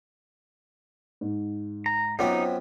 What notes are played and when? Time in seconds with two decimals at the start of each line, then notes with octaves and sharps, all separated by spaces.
1.21 G#2
1.86 A#5
2.19 F#2 B3 C4 D#4 F4 C#5 D6